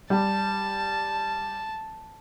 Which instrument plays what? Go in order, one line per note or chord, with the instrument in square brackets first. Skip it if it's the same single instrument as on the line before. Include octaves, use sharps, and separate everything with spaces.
[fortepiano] G3 [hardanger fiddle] A5